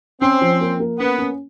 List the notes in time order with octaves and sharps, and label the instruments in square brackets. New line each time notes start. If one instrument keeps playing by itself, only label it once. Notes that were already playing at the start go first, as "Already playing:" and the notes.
[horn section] C4 [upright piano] C#4
[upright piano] F3
A#3
A#3
[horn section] B3 [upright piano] C#4
[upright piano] C#4